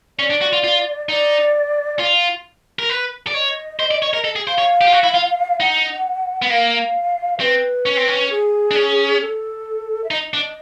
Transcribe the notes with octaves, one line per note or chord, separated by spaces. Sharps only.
C#4 D5
D4
F#4
F4
F4
D#4 D5
F4
A#4
B4
D5
C#5 D#5
C5
D5
C#5
A#4
A4
G#4
C5 F5
C#5
G4
F4
F#4
E4
F4
D#4 F#5
B3
A#3 F5
C4 B4
C#4
C4
C#4
G#4
D4
C#4
A4
E5
D#4 D#5
D4